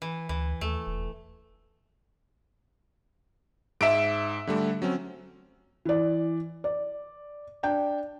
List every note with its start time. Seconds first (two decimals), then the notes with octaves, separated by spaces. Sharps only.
0.02 E3
0.29 D2 E3
0.61 D#2 A3
0.87 E1
3.81 G#2 E5 D7
4.47 D3 G3 A3
4.82 F#3 C4 C#4
5.85 E3 D5
6.64 D5
7.63 D4 G5